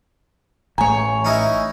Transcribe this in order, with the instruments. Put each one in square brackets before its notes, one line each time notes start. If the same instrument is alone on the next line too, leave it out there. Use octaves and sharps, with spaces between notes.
[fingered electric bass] A1 A3 [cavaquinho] C#5 G#5 [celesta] A#5
[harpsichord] C#4 D#4 E4